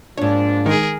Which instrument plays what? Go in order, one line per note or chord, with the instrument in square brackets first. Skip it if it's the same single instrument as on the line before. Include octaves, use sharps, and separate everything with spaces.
[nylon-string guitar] F2 G#2 [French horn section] F3 A#3 D4 [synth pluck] C#5
[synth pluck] D#3 G#3 D#4 [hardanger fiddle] G#4 A#4